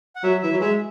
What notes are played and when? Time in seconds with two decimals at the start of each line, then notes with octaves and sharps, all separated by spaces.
0.16 F#5
0.23 F#3 E5
0.42 E3 E5
0.52 F#3
0.61 G#3 E5